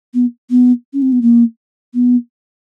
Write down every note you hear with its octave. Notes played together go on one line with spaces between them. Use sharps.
B3
B3
C#4
C4
B3
A#3
B3